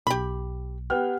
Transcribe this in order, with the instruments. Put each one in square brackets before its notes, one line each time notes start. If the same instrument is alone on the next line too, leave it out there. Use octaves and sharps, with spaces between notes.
[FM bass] B1 [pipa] G4 B5
[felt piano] B3 G5 F6 [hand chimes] G4 F#5